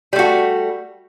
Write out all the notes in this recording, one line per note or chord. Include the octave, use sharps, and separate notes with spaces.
G3 A3 F#4